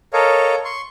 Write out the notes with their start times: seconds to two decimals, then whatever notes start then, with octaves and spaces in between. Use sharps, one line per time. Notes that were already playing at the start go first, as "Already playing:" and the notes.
0.13 A4 A#4 C#5 D#5 F5
0.65 C6 C#6